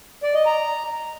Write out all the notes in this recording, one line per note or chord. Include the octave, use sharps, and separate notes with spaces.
D5
D#5
A#5